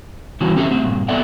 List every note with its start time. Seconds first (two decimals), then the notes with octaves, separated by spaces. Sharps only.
0.41 E3 G3 C4 E4 F#4
0.56 C4 C#4 G4 A4 C5 E5
0.71 A3 C4
0.83 G2 A#2
1.08 B3 C4 A4 D5 E5 F#5